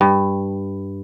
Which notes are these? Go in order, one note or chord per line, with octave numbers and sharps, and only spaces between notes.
G2